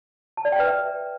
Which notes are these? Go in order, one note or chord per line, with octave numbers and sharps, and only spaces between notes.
A5
D5
G5
B4
E5